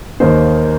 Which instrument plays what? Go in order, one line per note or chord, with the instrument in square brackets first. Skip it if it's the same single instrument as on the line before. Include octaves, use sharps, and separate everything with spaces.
[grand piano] D#2 D#3 A#3 D#4 C5